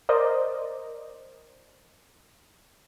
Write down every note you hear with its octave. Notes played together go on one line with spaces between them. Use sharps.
A#4 C5 D5 D#5